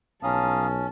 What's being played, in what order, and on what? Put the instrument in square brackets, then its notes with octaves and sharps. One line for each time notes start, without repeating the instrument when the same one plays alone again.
[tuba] B1 [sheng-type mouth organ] C#4 [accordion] F5 A#5 D#6 [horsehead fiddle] A5